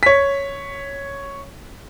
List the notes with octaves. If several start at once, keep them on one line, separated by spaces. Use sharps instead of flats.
C#5 B6